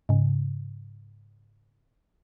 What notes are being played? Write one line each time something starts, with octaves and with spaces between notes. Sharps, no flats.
G#2 C#3